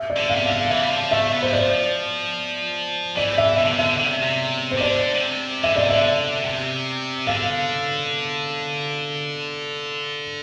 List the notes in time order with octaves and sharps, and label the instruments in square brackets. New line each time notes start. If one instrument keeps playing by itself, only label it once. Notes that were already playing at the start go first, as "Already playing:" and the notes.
Already playing: [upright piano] E5
D5
[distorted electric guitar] D3
[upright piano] F5
[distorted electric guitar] C3
D3
[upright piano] F5
[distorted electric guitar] E3 [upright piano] E5
[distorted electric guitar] G3
F3
[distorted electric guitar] A3 [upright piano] E5
[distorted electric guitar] B3
[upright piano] C5
[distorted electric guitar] F3 [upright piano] D5
[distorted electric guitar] E3 [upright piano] D5
[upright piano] E5
[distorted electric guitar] E3 [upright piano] E5
[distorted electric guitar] D3
C3
[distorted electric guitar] D3 [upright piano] E5
[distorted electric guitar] D3
C3
C3
[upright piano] C5
[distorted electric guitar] C3
[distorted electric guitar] D3 [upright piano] D5
[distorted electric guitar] D3
C3
[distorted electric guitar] E3 [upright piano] E5
[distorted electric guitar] D3 [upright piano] D5
[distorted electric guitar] C3
[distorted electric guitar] D3 [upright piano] E5
[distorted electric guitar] C3
[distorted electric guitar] D3 [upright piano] F5